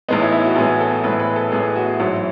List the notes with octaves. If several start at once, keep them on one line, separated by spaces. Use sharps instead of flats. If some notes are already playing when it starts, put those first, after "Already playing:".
A1 A2 G#3 B3 D#4
E4
E4
F#4
A1 A2 G#3 B3 G#4
A4
A1 A2 G#3 B3 B4
B4
A4
A1 A2 G#3 B3 G#4
F#4
A1 G#2 F#3 E4